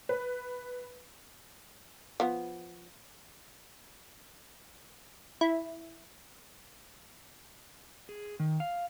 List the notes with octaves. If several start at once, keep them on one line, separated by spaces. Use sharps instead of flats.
B4
F3 B3
E4
G#4
D#3
F5